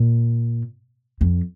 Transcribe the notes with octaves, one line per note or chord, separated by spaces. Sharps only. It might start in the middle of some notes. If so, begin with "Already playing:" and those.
Already playing: A#2
F2